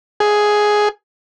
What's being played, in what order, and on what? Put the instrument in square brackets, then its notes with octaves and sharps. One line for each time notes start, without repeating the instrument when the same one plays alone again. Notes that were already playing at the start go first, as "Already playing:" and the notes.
[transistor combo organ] G#4